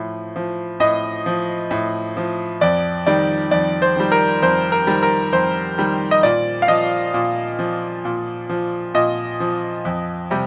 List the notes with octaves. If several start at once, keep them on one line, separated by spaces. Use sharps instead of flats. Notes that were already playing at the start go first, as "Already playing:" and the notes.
Already playing: A2 F3
F3
A2 D#5
F3
A2
F3
F2 D5
D#3 G3 D5
F2 D5
C5
D#3 G3
A#4
F2 C5
A#4
D#3 G3
A#4
F2 C5
D#3 G3
D#5
A#2 D5
F5
F3 D#5
A#2
F3
A#2
F3
A#2 D#5
F3
F2
C3 G3